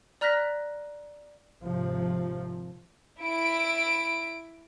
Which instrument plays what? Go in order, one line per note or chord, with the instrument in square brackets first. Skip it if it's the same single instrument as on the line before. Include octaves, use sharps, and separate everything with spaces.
[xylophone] D5 A#5 F6 F#6 A#6 B6
[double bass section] G#1 C3 F3
[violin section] E4 D7